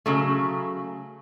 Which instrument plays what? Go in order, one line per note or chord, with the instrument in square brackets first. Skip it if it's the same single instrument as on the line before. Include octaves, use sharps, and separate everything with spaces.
[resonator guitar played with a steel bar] C#3 F#3 A3